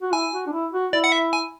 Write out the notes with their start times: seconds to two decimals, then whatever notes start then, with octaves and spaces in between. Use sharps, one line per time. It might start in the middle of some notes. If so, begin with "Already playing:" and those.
0.02 F#4
0.13 E4 G#5
0.33 F#4
0.47 D4
0.52 E4
0.73 F#4
0.93 E4 D5
1.04 F#5
1.12 E5
1.33 G#5